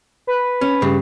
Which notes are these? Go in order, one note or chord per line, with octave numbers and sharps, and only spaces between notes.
B4
C#4
G2 C#3